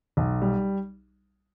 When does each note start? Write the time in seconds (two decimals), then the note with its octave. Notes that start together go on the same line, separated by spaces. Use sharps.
0.17 B1
0.42 G3